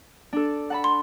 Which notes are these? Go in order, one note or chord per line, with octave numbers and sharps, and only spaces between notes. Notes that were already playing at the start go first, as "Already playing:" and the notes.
D4 A4
F#5 A5 B5
C6